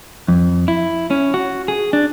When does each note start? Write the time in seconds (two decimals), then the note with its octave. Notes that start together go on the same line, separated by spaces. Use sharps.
0.28 F2
0.68 E4
1.10 C#4
1.34 F#4
1.68 G#4
1.93 D4